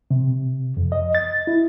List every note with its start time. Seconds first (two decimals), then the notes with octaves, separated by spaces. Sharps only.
0.11 C3
0.77 F2
0.92 D#5
1.15 A6
1.47 E4